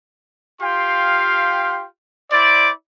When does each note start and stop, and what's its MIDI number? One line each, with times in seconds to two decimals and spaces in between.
0.61 1.86 65
0.61 1.86 67
0.61 1.86 77
0.61 1.86 79
0.61 1.86 84
2.32 2.71 64
2.32 2.71 72
2.32 2.71 74